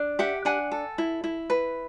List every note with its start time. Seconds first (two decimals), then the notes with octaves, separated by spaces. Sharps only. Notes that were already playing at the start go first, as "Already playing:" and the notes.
Already playing: D4
0.19 G4 E5 F#5
0.45 D4 F#5 G#5
0.71 A4
0.98 E4
1.24 E4
1.50 B4